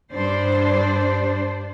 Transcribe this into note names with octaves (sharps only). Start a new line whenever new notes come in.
G2 D4 C5